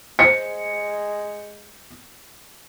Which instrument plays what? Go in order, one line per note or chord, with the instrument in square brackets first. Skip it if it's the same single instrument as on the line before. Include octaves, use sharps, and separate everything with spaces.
[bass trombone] G#3 [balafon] C5 [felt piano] C#7